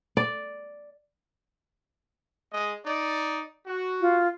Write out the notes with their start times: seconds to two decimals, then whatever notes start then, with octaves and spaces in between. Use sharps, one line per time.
0.17 D5
2.52 G#3 D#5
2.86 D#4 D5
3.66 F#4
4.01 F4